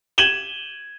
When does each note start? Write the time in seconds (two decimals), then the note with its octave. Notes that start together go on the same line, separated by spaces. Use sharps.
0.18 G#6 D#7 E7 F#7 G7